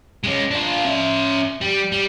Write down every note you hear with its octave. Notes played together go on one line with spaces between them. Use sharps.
G#3 C#4
D4 F4
C#4 E5
G3
G3